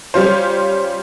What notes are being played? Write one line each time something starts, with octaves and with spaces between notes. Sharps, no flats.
G3 C#4 F4 C5